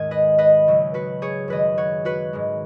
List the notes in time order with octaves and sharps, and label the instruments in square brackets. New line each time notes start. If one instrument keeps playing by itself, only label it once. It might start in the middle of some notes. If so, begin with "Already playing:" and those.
Already playing: [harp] D#2 G#2 D#3 G#3 G#5
B4 D#5
B4 D#5
C#2 C#3 F#3
F#4 B4
G#4 C#5
F#2 D#3 G#3 B4 D#5
C#5 F#5
F#4 B4
G#2 D#3 G#3